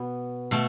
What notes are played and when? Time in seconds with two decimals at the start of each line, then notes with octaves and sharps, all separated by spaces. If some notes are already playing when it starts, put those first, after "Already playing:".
Already playing: B2 B3
0.51 B2 A3